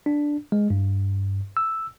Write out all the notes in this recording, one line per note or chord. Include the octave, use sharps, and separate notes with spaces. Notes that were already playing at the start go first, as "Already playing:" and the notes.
D4
G#3
G2
E6